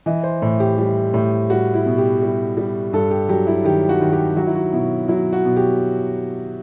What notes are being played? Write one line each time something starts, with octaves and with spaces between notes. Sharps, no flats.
E3 D#5
C5
A2
G4
G3
A2
G3 F#4
E4
B2
G4
G3
G3
G2 A4
G4
F#3 G4
E4
D#3 G4
F#4
D#3
G4
F#3 F#4
E4
F#4
B2 E4
F#3 E4
F#4
B2
G4